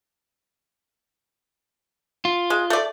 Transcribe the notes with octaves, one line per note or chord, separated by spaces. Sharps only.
F4
G#3
A3 D5